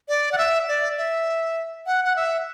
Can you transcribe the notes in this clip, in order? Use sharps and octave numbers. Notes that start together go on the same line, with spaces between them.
D5
F#5
E5
D5
E5
F#5
F#5
E5